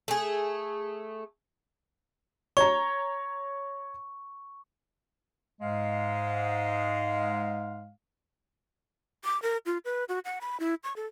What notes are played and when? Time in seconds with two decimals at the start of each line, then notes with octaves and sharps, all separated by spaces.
0.08 A3 G#4
2.57 C#5 A#5 C#6
5.61 G#2 G#3 F5
9.24 D6
9.42 A#4
9.66 F4
9.85 B4
10.09 F#4
10.25 F#5
10.41 B5
10.60 E4
10.84 C#6
10.96 A4